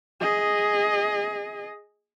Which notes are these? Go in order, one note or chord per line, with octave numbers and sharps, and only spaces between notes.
G#4 D#5